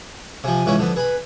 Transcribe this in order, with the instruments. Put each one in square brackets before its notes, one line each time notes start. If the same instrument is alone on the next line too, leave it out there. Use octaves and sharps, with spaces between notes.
[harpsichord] C3 F3 [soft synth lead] G#5
[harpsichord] C#2 E3 C#4
[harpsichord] D3 B3 [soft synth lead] F3
[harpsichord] G#4 B5 [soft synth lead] B4